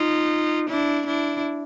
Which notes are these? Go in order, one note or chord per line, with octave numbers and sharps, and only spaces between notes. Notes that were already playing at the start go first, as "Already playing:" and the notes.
Already playing: D#4 F4
D4 E4
D4 E4